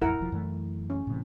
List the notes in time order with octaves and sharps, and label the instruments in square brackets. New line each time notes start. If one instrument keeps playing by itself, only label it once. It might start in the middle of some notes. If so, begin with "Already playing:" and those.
[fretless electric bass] A1 F2 [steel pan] E4 A#4 F#5
[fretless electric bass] E1 F3
F#2 E3 A3
[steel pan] C#4
[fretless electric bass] A2 C3 E3